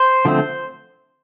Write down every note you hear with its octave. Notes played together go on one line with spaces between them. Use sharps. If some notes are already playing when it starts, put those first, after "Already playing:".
Already playing: C5
D3 F3 A3 C4